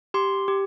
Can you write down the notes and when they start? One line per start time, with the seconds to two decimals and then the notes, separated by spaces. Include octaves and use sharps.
0.14 G4 C6
0.48 G4